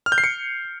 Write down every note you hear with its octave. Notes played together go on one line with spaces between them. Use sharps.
F6
G6
C7
C#7